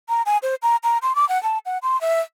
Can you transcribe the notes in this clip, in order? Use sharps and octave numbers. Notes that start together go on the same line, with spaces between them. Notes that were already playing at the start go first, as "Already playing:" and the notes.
A#5
G#5
C5
A#5
A#5
C6
D6
F#5
A5
F#5
C6
E5